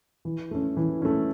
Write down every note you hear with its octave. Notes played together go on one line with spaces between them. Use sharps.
E3
A3 C#4
E3
A3 C#4